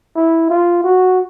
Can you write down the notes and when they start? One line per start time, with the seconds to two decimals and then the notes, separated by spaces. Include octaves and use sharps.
0.16 E4
0.50 F4
0.84 F#4